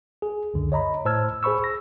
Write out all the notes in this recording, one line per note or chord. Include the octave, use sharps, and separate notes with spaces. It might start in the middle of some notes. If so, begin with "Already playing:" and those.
G#4
C#2 F#2 D3
C#5 D#5 A#5 B5
A2 C5 A5 E6 F6 G#6
G#4 C5 B5 C#6 E6
A#6